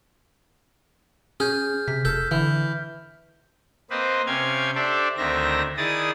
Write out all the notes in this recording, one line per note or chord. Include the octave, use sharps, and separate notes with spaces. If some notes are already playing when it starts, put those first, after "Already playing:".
C#4 G#4 F6 G6
C3 B6
F1 A4 F6 G6
D3 E3
A#3 C4 B4 C5 D#5
C3 C#4 F5 G5 G#6
D4 G4 A4 C5 D5 E5
D2 D#3 C4 E5 A#6
D#3 E4 G#4 D5 D#6 A6